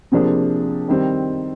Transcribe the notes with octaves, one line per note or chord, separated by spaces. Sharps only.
C3 F3 A#3 D4 G#4
D#3 G3 C4